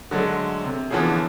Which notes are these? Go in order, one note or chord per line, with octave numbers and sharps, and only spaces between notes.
D3 F#3 G#3 A3
C3
D3 E3 F3 B3 C#4 G#4